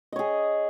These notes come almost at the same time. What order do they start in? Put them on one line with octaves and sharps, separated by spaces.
D#5 C#5 G#4